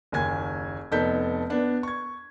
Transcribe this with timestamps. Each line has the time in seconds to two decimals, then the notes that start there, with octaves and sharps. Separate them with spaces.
0.12 F#1 D#2 G#5 G#6
0.91 F1 B3 D#4 A4 G6 B6
1.50 B3 D4 B4
1.83 C#6 G#6